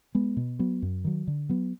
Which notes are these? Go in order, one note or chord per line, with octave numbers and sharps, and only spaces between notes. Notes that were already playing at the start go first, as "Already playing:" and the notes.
G#3 B3
B2
F#3 B3
F#2
D#3 F#3
D3
F#3 B3